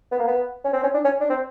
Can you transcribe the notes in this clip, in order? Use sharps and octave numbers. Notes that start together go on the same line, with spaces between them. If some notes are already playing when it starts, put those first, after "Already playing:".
B3
A#3
B3
C#4
C4
C#4
D4
C#4
D4
C4